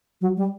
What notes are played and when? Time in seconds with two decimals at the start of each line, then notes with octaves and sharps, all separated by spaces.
0.21 F#3
0.37 G3